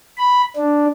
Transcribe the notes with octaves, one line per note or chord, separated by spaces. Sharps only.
B5
D4